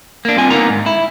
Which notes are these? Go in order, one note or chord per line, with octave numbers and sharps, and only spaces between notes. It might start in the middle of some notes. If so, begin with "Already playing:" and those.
A#3 D4
G2 C4 F4 G#5
D3 A#3 B3 D#4 A#4 A#5
G#2
E4